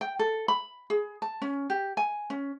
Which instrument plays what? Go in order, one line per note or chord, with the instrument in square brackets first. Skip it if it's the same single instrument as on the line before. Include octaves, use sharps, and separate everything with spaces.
[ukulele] G5
A4
B5
G#4
A5
C#4
G4
G#5
C#4